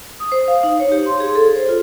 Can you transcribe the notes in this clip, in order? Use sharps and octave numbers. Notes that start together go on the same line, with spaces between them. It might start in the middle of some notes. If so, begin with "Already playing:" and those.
D#6
C5
F5
D#4
C#5
G4
C6
G#4
A4
C5
F4